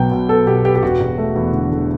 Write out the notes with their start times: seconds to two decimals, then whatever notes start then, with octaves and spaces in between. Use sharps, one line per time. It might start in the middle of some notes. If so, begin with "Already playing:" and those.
Already playing: B1 B2 F#3 B3 G5
0.12 B2
0.29 B3 A4
0.47 B2 G4
0.65 B3 G4
0.76 G4
0.83 E1 F#4
1.00 E1
1.18 A3
1.36 E2
1.53 D3
1.71 D3